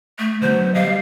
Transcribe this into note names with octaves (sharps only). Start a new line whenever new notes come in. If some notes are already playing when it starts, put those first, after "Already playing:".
A3
D3 F#3 B3 C5
G3 D#5 F5